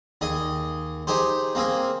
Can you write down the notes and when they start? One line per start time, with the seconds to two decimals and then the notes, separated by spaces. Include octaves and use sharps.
0.21 D#2 G#4 D#5
1.07 D#4 G4 G#4 C5
1.55 A#3 C4 G#4 A#4